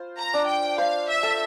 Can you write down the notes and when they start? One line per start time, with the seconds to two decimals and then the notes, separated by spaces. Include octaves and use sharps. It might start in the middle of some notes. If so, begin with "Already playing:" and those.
Already playing: F4 C5
0.19 A#5
0.34 D4
0.48 G5
0.78 C5 F5
1.09 E5
1.23 A4